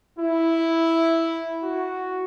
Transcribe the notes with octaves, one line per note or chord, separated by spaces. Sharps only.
E4
F#4